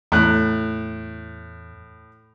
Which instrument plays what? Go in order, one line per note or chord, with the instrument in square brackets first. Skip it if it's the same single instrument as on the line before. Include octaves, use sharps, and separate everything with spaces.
[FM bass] E2 [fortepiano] A2 F#6